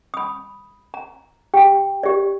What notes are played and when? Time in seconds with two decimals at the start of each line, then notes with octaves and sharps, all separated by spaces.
0.14 B5 D#6
0.94 A#5
1.54 G4 G5
2.03 G4 D5